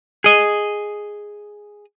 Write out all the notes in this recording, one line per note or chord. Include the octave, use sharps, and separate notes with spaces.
G#4 D#5